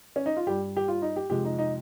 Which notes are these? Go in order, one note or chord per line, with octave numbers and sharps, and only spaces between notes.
C#4
D#4
F4
G2 G3 G4
G4
F4
D#4
G4
F2 C3 F3 G#3 G4
D#4
D#4